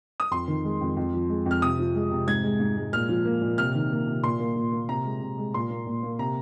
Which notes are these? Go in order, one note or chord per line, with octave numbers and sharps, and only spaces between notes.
D#6
F2 C6
D#3
G#3
F2
F2
F3
G#3
F2
F6
C3 D#6
F3
G#3
C3
G#2 G#6
G#3
G#2
G#3
A#2 F6
F3
A#3
A#2
C3 F6
D#3
A#3
C3
A#2 C6
A#3
A#2
A#3
C3 A#5
G#3
C3
G#3
A#2 C6
A#3
A#2
A#3
C3 A#5